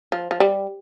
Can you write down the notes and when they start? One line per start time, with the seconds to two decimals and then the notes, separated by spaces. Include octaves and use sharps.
0.12 F3
0.31 F3
0.40 G3